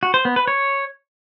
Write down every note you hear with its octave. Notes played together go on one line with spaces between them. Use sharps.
F#4
C5
B3
B4
C#5